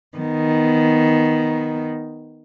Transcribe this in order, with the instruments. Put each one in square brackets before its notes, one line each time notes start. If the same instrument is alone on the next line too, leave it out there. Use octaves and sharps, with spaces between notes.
[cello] D#3 B3